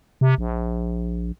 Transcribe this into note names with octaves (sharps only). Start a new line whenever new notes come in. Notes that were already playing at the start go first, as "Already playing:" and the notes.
C3
A#1